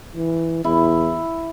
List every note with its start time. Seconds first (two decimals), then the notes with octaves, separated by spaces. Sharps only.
0.16 E3
0.64 E2 E4